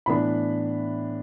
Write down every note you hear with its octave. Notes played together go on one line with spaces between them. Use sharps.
A2 E3 B3 D4 B5